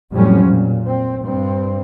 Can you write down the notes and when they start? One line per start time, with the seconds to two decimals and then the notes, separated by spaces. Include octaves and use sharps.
0.12 F2 A2 F#3 G3 C4 C#4
0.45 A#2
0.87 C4
1.23 G2 C4